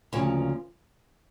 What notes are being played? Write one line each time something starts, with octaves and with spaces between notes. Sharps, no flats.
D2 C#3 F3 A#3